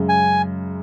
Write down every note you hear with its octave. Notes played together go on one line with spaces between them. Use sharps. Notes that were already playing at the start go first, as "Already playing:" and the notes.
Already playing: F#2 C#3 G#3
G#5